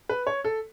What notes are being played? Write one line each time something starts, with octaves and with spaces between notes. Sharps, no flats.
B4
C#5
A4